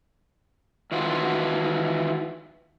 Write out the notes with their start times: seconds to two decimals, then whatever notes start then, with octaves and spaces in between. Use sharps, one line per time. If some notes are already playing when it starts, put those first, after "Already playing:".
0.92 D#3 E3 F4 F#4